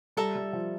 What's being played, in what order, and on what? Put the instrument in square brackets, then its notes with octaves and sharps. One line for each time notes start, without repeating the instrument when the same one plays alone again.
[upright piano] G3 [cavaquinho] A4 E5 A#5
[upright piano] G3
F3